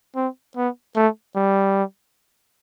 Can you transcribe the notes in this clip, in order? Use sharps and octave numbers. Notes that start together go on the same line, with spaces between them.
C4
B3
A3
G3